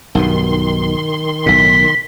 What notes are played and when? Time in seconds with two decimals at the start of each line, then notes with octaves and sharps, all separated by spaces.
0.15 B1 G2 B2 D#3 C6
1.46 B1 A2 B6